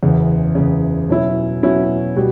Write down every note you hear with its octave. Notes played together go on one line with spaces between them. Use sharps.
F#1 E2 C#3
F#1 E2 C#3
B2 F#3 C#4 E4
B2 F#3 C#4 E4
B2 G3